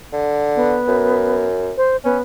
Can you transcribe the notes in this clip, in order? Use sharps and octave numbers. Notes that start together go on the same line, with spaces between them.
D3
B3
F#2
C5
B3 C#4